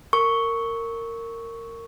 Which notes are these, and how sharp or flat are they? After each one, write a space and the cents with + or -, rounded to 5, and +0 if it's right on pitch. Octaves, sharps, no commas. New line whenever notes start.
A#4 -20 C#6 +0